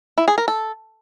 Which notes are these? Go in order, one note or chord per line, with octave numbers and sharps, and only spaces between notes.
E4
G#4
A#4
A4